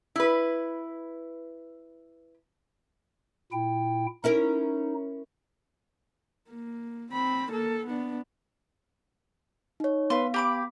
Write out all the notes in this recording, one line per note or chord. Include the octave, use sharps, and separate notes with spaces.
E4 B4
A#2 E4 G5
C#4 D#4 E4 A#4
A#3
C4 B5
A#3 A4
B3 D4
D#4 C#5
B3 B4 F5 C6
G4 B5 D6